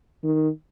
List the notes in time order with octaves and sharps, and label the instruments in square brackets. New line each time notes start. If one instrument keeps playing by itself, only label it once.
[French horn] D#3